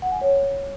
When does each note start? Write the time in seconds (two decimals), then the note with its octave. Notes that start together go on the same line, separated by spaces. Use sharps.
0.02 F#5
0.12 G#5
0.21 C#5